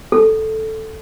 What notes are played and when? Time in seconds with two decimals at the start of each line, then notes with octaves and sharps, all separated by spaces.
0.12 A4